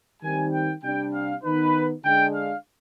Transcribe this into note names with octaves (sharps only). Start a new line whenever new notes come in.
D#3 G3 C4 G#5
G5
C3 G3 D4 G5
F5
D#3 B3 D#4 B4
D3 G#3 D4 G5
F5